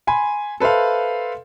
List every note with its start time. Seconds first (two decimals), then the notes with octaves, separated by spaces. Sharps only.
0.07 G#5 B5 C6
0.60 A4 B4 C5 E5 F5